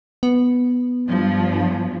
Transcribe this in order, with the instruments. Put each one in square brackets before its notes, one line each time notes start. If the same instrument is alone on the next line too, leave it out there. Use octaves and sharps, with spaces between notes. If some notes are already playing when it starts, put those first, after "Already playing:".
[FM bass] B3
[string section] G2 F3